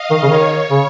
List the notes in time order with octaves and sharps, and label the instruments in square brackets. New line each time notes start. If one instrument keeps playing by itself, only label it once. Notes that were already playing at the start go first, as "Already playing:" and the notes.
Already playing: [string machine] D#5 F5
[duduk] D#3
C#3
[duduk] D#3 [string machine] C#5
[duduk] C#3